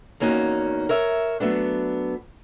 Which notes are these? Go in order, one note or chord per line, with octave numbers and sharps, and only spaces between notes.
E2 A#3 C#4 D#4 F#4
A#4 C#5 E5
F#3 A3 B3 D4